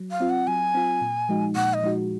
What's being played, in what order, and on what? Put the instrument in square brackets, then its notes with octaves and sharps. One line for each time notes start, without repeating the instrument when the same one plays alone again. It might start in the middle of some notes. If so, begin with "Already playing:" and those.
Already playing: [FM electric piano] F#3
[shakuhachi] F5
[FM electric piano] C4 F4
[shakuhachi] F#5
[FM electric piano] F#3 [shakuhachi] G#5
[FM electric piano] C4 F4
A#2
F3 G#3 D#4 F#4
[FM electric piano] A#2 [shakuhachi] F#5
[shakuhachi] D#5
[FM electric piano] F3 G#3 D#4 F#4